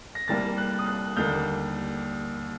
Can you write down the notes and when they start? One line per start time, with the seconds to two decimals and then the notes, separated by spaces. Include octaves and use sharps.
0.15 A#6
0.28 C2 C3 G3 A#3 A6
0.58 F#6
0.79 D#6
0.86 F#6
1.16 D#2 D3 G3 A#3 G6